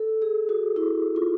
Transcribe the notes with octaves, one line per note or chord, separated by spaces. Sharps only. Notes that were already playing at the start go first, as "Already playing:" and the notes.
Already playing: A4
G#4
F#4
E4
F4